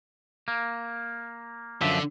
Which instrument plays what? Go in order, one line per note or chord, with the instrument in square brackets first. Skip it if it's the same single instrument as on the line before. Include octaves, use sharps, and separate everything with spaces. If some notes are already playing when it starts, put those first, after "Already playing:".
[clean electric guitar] A#3
[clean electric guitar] F#2 F3 E5 [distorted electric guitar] D3